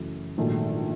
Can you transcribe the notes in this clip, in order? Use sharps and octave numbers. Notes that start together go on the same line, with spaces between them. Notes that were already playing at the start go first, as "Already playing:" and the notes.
Already playing: F#2 C#3 E3 A3
A#1 G#2 D#3 F#3 A3